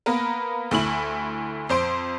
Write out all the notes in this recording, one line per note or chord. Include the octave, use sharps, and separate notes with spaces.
A#3 B3 A#4 B4
D2 A3 E4 F#7
F2 C5 C6 D7